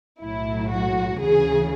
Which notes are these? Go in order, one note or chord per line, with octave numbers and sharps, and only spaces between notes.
B1 A2 F#3 E4
F#4
D2 C#3 E3 G#4